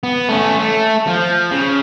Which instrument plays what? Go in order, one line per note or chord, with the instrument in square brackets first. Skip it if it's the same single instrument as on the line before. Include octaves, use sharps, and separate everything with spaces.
[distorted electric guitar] B3
A3 C#4
A3
F3
C#3